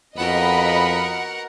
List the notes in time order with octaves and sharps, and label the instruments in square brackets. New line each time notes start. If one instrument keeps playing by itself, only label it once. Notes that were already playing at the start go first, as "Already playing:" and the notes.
[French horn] F2 [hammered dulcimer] B3 D#4 F#4 [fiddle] A#4 F#5 [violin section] D#5 B5